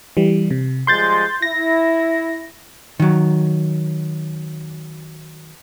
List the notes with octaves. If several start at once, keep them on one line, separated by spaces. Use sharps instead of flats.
E3 G3
C3
F3 G3 G#3 C6 G6 A6
E4 A#6
D#3 F#3